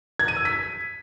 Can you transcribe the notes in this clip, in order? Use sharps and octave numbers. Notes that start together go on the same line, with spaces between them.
G#6
D#7
E6
B6